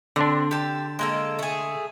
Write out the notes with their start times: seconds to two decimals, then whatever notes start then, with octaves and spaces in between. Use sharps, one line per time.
0.16 D3 C4 D4
0.51 G4 A5
0.99 G#3 A#3 A4
1.39 A3 G#4